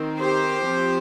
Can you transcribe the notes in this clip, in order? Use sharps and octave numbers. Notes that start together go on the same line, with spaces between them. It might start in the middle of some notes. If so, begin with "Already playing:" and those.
Already playing: D#3 C4
G4 C5
F3 C4